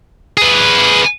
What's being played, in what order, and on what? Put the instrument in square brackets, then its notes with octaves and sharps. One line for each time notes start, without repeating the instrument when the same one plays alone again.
[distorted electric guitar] G#4 B4